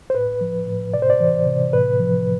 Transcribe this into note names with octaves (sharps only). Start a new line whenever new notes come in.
C5
A2 B4
F3
A2
C3 D5
C5
D5
E3
C3
A2 B4
F3